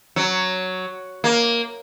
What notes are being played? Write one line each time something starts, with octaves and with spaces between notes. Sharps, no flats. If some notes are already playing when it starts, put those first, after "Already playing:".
F#3
A#3